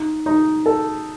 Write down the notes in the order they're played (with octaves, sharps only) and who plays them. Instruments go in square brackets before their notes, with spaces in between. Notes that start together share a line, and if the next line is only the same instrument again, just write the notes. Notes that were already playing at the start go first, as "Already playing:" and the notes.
Already playing: [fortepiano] D#4
D#4
A4